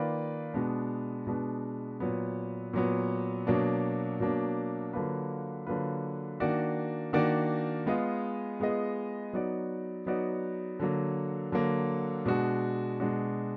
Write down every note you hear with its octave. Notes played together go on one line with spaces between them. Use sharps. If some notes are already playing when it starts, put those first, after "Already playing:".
Already playing: D#3 A#3 F4 B4 D5
B2 G#3 B3 D4
B2 G#3 B3 D4
A#2 F#3 B3
A#2 F#3 B3
B2 F#3 A#3 D4
B2 F#3 A#3 D4
D3 F#3 A#3 F4 B4
D3 F#3 A#3 F4 B4
D#3 A#3 D4 F#4 D5
D#3 A#3 D4 F#4 D5
G#3 B3 F4 G#4 D#5
G#3 B3 F4 G#4 D#5
F#3 B3 D#4 F#4 D5
F#3 B3 D#4 F#4 D5
D3 F#3 A#3
D3 F#3 A#3
B2 G#3 D4 F#4
B2 G#3 D4 F#4